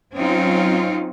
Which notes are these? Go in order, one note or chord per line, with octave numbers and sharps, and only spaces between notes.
F#3 C4 C#4 D#4 F4